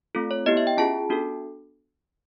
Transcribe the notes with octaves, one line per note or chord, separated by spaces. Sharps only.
A3 C4 F4 A4
C#5
B3 E4 G4 D#5
E5
G5
C#4 F4 G#4 A5
B3 D4 F#4 A4